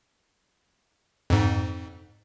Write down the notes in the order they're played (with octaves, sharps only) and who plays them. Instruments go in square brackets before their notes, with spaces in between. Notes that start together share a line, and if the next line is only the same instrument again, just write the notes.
[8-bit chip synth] F2 G#2